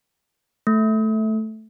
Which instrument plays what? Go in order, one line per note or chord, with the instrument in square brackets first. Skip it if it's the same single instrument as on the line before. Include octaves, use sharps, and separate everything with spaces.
[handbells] A3